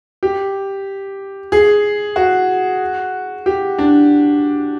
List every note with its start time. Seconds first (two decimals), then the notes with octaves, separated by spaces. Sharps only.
0.23 G4
1.52 G#4
2.16 F#4
3.46 G4
3.78 D4